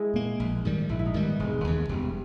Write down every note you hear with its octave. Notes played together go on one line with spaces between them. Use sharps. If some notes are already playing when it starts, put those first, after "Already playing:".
Already playing: G#3 E4 G#4
A#2 A#3
A#1
G#2 D#3 G3
A#1 E4
E4
D#4
G#2 D#3 G3
B3
E1 G#3
D#2 C#3
E1 G3